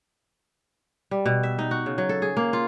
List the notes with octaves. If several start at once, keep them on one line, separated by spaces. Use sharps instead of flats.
G3
B2
E5
D#4
F#4
C#3
F#3
A4
G#4
A#3
F4